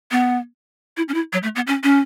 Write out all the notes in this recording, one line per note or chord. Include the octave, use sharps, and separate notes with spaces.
B3
E4
C#4
E4
F#3
A3
B3
C#4
C#4